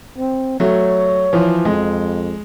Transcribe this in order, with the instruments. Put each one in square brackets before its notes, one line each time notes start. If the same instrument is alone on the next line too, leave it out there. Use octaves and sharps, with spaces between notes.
[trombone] C4
[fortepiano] F#3 A3 [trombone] C#5
[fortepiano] E3 F3
[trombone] F2 [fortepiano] G#3